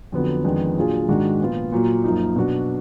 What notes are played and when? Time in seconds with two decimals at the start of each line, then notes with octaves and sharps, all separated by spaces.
0.12 F2 D3 F#3 B3
0.44 F2 D#3 G#3 B3 D4
0.76 A#2 F#3 D4 F4 G#4
1.08 G#2 D#3 G#3 D4 F#4
1.40 A#2 F3 B3 F4
1.72 A#2 F#3 A#3
2.04 F#2 F3 A#3 D#4
2.36 B2 F#3 D4 F#4